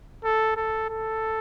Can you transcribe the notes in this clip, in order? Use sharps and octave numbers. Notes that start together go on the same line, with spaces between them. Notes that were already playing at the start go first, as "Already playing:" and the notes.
A4
A4
A4